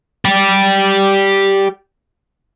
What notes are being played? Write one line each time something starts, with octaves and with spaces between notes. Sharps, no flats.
G4 D5